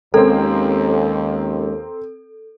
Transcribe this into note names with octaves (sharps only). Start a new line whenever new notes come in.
D#2 G#3 C4 C#4 A4 A#4